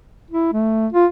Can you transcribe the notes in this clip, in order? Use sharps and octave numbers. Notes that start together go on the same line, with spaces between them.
E4
A3
F4